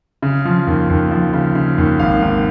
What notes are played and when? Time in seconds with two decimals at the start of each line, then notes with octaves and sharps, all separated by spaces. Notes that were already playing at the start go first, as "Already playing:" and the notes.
0.22 C#3
0.45 F3
0.67 D#2
0.90 D#2
1.11 F3
1.34 C#3
1.55 C#3
1.78 D#2
2.00 G#1 F5
2.22 G#1